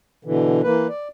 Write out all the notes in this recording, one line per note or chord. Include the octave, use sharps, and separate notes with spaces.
B2 D3 E3
E3 A#3 B4
D5